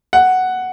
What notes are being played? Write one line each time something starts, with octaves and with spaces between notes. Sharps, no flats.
F#5